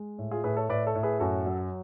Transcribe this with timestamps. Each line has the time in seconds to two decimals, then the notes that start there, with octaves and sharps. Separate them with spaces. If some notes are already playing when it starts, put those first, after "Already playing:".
Already playing: G#3
0.18 A2
0.31 F4 G#4
0.44 A2 G#4 B4
0.57 A4 C#5
0.69 A2 B4 D5
0.86 A4 C#5
0.95 A2
1.03 G#4 B4
1.20 F#2 F#4 A4
1.46 F#3